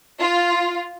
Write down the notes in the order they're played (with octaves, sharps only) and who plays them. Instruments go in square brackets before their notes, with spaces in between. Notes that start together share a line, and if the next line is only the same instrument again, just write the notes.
[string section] F4